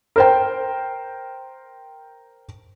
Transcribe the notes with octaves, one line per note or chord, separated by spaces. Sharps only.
A#4 C5 G5